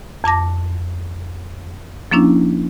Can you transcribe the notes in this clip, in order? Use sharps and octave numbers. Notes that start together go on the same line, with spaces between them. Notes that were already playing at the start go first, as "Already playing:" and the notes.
F2 A5 D6 A#6
F3 A#3 C#4 D4 E4